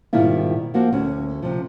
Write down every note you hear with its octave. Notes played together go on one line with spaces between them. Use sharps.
G#2 B2 D#3 G3 E4 F4
F3 A#3 C4 F#4
D2 C#4
C3 F3